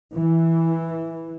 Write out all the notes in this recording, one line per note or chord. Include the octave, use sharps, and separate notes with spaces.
E3